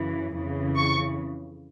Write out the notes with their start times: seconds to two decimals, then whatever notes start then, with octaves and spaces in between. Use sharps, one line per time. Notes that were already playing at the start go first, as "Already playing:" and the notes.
Already playing: F#2 C#3 E3
0.32 F2 C#3 E3
0.76 C#6